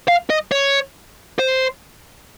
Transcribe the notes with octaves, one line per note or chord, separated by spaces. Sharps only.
F5
D#5
C#5
C5